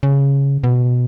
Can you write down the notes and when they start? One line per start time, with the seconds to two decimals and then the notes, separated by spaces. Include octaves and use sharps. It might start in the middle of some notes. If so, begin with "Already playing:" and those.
0.03 C#3
0.64 B2